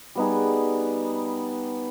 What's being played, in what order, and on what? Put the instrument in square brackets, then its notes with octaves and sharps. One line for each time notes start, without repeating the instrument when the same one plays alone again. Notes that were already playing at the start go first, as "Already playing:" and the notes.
[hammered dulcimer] G3 B3 D#4 G#4